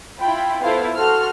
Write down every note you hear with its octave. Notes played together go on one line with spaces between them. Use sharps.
E4 F4 G5 B5
B3 E4 F4 A4 C5 F5
F#4 A4 C6 F6